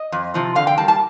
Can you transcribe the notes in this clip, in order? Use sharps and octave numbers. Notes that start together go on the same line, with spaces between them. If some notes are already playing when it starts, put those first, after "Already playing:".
Already playing: D#5
F2
C3 F3 C4
D3 F5
G5
G3 A#3 A5
A5